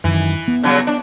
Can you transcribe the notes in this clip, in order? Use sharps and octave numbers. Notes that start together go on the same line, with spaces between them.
F#2 D#3 E3
B3
C#3 F#3 G3
D4